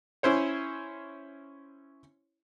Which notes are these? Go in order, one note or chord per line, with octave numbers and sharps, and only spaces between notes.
C#4 E4 C5 C#5